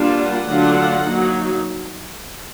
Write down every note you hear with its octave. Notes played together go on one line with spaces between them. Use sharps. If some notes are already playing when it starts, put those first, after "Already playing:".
Already playing: G3 A#3 D4 F4
F#5
D3 F#3 A3 D4 F4
F#3 A#3 D#4